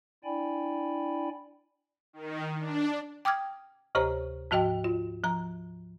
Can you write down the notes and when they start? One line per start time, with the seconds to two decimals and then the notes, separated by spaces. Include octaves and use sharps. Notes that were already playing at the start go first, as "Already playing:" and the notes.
0.24 D4 E4 D5 G5 G#5 B5
2.13 D#3
2.59 D4
3.25 G5 D6 D#6 F6 G#6
3.95 D2 C3 G4 C5 C#5 A#5
4.51 G#2 F3 F#4 D#5 G5
4.84 F4
5.24 F3 A#5